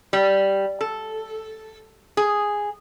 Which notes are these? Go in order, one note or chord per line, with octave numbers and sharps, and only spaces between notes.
G3
A4
G#4